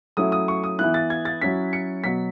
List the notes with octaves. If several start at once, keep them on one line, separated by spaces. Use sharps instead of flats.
F#3 A3 C#4 E4 D#6
D#6
C#6
D#6
E3 B3 E4 F#6
A6
G#6
A6
F#3 C#4 E4 B6
C#7
B2 F#3 B3 B6